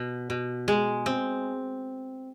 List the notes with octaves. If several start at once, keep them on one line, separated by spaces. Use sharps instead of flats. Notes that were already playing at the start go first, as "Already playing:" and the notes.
Already playing: B2
B2
G#3
C4